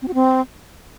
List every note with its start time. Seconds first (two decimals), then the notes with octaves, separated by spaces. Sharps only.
0.02 C4
0.08 F#4
0.14 C4